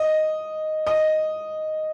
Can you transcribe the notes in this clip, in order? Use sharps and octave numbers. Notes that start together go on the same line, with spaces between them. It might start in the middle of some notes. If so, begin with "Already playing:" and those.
Already playing: D#5
D#5